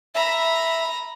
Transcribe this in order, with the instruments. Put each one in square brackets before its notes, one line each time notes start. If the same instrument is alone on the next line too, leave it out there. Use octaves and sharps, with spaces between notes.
[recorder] E5 [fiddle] A#5 B5